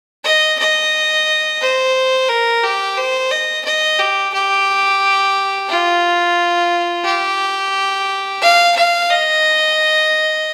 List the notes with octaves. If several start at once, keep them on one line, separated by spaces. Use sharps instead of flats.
D#5
D#5
C5
A#4
G4
C5
D#5
D#5
G4
G4
F4
G4
F5
F5
D#5